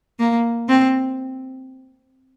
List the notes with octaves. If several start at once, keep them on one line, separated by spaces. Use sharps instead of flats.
A#3
C4